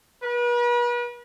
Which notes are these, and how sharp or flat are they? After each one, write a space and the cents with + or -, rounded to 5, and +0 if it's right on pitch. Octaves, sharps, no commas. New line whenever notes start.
B4 -40